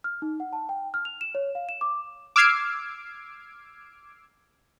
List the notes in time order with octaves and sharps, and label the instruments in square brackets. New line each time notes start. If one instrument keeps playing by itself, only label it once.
[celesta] F6
D#4
F#5
A5
G5
F6
F7
E7
C#5
F5
E7
D6
[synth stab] D6 E6 F6 G#6 C7 D7